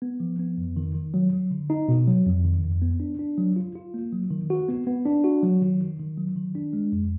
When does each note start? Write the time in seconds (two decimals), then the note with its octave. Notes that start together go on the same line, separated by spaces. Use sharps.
0.02 B3
0.20 F3
0.39 B3
0.58 F2
0.77 D#3
0.95 D#3
1.14 F#3
1.33 F#3
1.51 D3
1.70 D#4
1.88 B2
2.07 F#3
2.26 F2
2.44 D#3
2.63 F2
2.82 B3
3.00 D4
3.19 D4
3.38 F#3
3.56 F4
3.76 F4
3.94 A#3
4.12 F#3
4.31 D#3
4.50 F#4
4.68 B3
4.87 B3
5.06 D4
5.24 F#4
5.43 F#3
5.62 D#3
5.80 D#3
6.00 D#3
6.17 F#3
6.36 D#3
6.55 D4
6.73 G#3
6.92 F2